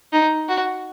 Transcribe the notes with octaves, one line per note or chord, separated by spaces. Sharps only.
D#4
F#4